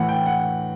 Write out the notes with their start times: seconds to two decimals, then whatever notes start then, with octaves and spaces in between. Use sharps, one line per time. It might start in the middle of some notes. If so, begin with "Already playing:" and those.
Already playing: A2 E3 F#5
0.09 G5
0.26 F#5